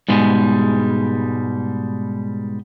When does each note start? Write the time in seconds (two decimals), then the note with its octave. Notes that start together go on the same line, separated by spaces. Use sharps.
0.08 G#2 B2 G3 G#3